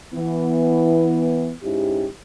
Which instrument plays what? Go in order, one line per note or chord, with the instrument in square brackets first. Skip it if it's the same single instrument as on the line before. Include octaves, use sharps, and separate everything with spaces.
[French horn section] E3 B3
G#2 C#4 E4 G4